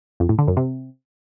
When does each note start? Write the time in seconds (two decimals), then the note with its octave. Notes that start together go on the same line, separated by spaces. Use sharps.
0.20 F2
0.29 A2
0.38 D3
0.48 F#2
0.57 C3